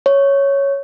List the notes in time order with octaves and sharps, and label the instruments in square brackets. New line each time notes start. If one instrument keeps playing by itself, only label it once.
[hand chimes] C#5